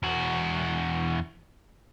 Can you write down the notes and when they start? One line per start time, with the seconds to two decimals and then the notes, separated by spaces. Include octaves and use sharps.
0.03 E2 F#4